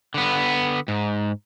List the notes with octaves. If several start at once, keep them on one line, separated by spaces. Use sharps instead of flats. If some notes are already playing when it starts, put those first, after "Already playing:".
D3 B3
G#2